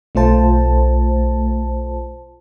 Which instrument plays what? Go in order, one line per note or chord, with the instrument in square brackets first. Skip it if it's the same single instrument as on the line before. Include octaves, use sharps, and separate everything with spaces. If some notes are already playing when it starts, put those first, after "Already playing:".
[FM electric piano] B1 A3 F4 C5 A5